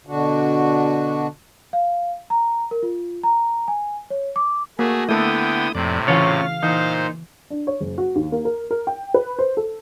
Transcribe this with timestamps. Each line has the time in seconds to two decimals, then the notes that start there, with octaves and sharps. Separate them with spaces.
0.07 B2 D3 D4 F#4
1.73 F5
2.30 A#5
2.71 A#4
2.83 F4
3.23 A#5
3.68 G#5
4.10 C#5
4.36 D6
4.79 A3 A#3 F#4 G#4
5.09 D3 A3 B3 E4 A4 G5 D#6
5.75 F2 A2 C3 D5
6.08 C#3 E3 C#4 F4 C#5 F5
6.63 A#2 E3 D#4 C5
7.50 D4
7.67 C#5
7.80 F#1
7.98 F#4
8.15 D#2
8.32 A#3
8.45 A#4
8.71 A#4
8.87 G5
9.14 B4
9.39 C5
9.57 A4